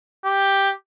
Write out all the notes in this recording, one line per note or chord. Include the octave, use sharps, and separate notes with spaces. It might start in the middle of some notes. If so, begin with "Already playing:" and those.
G4